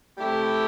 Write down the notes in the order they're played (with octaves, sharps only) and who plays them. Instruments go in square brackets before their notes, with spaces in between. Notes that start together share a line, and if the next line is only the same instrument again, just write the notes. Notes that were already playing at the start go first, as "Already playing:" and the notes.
[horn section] C3 A3 E4 G4